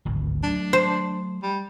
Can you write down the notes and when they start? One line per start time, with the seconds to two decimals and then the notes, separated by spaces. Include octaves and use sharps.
0.05 D1 G#1 D2
0.43 F#3 A3 D4
0.73 C5
1.43 G3